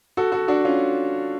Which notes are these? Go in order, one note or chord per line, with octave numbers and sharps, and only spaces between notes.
F#4 A4
F#4 A4
D4 F#4
C#4 F4